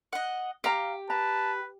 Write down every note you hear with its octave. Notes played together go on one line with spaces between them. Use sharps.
D#5 F#5
G4 F5 A#5
B4 A5 A#5